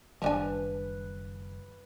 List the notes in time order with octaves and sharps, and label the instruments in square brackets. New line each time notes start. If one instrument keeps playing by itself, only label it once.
[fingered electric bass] F#1 D#3 G3 [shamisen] F3 D4 G#5 [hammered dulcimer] B4